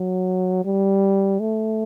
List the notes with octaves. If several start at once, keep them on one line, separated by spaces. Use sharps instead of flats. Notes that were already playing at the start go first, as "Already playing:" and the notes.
Already playing: F#3
G3
A3